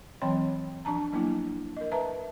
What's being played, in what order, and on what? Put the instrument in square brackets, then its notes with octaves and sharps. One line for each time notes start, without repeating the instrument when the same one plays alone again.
[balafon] E3 F#3 C4 C#5 G5 B5
F3 D4 A5 A#5
F#3 A#3 B3 D4 E4
A#4 D#5
B4 E5 A5 A#5